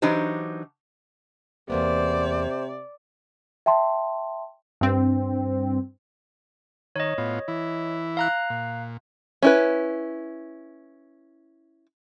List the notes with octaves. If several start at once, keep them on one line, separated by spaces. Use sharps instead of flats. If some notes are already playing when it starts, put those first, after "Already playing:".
E3 F#3 D4 D#4 G4 C5
E2 C3 A#3 B3 C5 D5
E5 G5 A5 C6
G2 C4
D#3 C#5 D#5
A2 B3 F4
E3 E4
F5 A#5 F#6
A#2
C#4 E4 B4